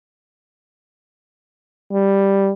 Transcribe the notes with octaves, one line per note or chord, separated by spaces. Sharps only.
G3